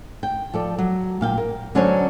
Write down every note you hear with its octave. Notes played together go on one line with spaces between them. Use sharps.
G5
F3 A4 D5
F#3
A#2 F5 G5
A#4
D3 F#3 C#4 D4 C5 C#5